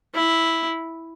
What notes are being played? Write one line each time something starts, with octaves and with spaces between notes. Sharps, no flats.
E4